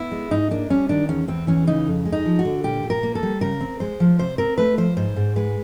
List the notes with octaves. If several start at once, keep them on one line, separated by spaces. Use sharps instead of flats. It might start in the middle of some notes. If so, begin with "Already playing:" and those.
Already playing: B3 E4
G#3
G#2 D#4
A#3 D4
G3 C#4
D#3 D4
E2 C#4
E2 C4
E3 C#4
C#3 D#4
F2
G#3
D#4
F3
F#4
D3
A#2 G4
A#2
A#4
A#3
A4
G3
C#3 A#4
C4
G#3 C5
F3
C3 C5
C4 A#4
A3 B4
F3 C5
G#2 C5
G#2
G#3 B4